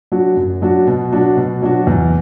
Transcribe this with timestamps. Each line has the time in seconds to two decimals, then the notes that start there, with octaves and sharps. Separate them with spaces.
0.12 F#3 D4 F#4
0.36 F#2
0.62 F#3 D4 F#4
0.87 B2
1.12 F#3 D4 F#4
1.37 B2
1.62 F#3 D4 F#4
1.87 E2